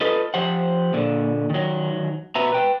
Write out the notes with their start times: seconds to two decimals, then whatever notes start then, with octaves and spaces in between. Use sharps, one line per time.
0.01 F4 A4 B4 D#5
0.34 F3 G4 C5 F#5
0.93 A#2 D3
1.50 D#3 F#3
2.35 B2 F#4 B4 E5 A#5
2.52 B4 G5